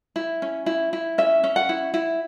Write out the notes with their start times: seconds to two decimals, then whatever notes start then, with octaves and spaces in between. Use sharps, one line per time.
0.16 E4
0.42 C#4
0.66 E4
0.93 E4
1.18 C#4 E5
1.44 C#4
1.56 F#5
1.69 E4
1.94 E4